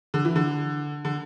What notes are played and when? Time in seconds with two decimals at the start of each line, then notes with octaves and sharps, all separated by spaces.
0.14 D3
0.25 E3
0.36 D3
1.05 D3